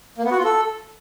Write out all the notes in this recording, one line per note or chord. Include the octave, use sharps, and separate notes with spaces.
A#3
B3
F#4
F4
A4